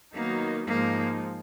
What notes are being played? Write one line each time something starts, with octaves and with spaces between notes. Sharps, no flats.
D#3 F#3 A#3 B3 D#4
G#2 F3 G#3 A#3 D#4